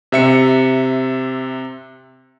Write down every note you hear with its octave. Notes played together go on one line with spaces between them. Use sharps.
C3 E5 C#7